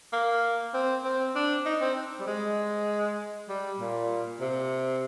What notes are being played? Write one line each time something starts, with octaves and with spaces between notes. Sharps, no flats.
A#3
C4
C4
D4
D#4
C4
G3
G#3
G3
A#2
C3